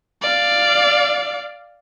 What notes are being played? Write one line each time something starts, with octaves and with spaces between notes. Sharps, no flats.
D5 F5